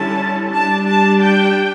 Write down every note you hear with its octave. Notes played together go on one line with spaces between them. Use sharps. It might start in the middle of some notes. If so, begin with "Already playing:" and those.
Already playing: D3 G3 C#4 E4 A5
G3 D4 A5
A5
G5